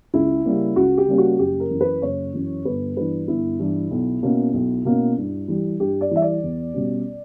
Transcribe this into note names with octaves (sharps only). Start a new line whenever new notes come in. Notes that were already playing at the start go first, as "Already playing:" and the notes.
C#2 E4
C#3 G3 A#3 C#4
C#2 F#4
G4
C#3 G3 A#3 C#4
F#4
F#1 G4
A#4
F#2 E3
B4
F#1 C#5
F#2 E3
G1 B4
G2 E3 B4
G1 E4
G2 E3
B1
B2 A#3 C#4
B1
B2 A#3 C#4
G2
E3 G3
G2 G4
D5
E3 G3 E5
D5
E2
B2 G3 C#4